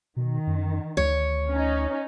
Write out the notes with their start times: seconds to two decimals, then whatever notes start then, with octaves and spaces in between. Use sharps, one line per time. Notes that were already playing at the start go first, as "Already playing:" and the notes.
0.16 B2 D#3
0.47 F#2
0.97 D2 C#5
1.48 C#4 D#4